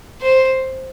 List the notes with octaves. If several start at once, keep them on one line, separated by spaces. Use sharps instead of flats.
C5